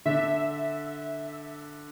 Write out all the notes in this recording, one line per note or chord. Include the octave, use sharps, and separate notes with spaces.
D3 E5